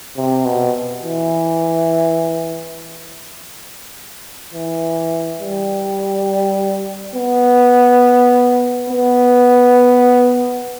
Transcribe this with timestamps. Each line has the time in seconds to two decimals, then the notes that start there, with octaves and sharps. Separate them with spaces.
0.17 C3
0.45 B2
1.04 E3
4.53 E3
5.41 G3
7.15 B3
8.90 B3